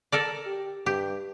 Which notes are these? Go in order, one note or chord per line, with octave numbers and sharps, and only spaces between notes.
A4 A#4 D5
G4
G2 G4